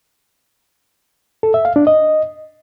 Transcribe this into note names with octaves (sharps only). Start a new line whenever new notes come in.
A4
E5
F5
D4
D#5